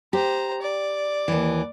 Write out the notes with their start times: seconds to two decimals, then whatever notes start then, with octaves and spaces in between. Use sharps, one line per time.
0.13 G4 C5 A#5
0.62 D5
1.28 D#2 E3